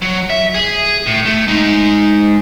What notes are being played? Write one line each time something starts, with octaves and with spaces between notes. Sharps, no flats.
F#3
E5
G#4
A2
A3
G#3 D#4